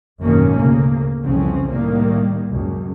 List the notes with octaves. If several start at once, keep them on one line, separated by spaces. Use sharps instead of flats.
G#1 F#2 B2 D#3 A#3 C#4
D2 C#3 A#3
C2 F2 C#3 E3 C4 C#4
A2 C3 D#3 G3 A#3
C#2 F#2